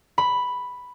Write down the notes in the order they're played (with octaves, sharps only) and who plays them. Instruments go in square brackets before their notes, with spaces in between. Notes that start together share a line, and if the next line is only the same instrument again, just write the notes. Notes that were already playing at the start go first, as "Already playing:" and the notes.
[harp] B5